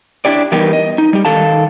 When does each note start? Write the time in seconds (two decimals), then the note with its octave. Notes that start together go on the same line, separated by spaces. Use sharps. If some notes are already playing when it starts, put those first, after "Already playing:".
0.25 D4 E4 G4 D5
0.52 E3 G3 B3 D#4 G4 A#4
0.73 D#5
0.98 D#4
1.13 G3 G4
1.25 D#3 A4 F5 A5